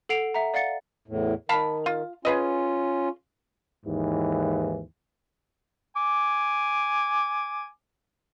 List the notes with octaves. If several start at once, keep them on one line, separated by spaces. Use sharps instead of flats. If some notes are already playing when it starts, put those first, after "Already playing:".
A4 F#5 C7 D7 F7
E5 F#5 A#5
D5 F5 F#5 A6 C#7
E2 A2
D#3 F5 A5 B5
F4
C#4 F4 G#4 B4 D#5
D#2 G#2 E3
G#5 D6